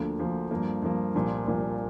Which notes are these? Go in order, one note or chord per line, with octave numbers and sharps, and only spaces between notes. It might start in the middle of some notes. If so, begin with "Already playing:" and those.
Already playing: D2 D3 F3 A#3
D2 D3 F3 A#3
G2 F3 A#3
G2 F3 A#3
C2 A#2 F3
C2 A#2 F3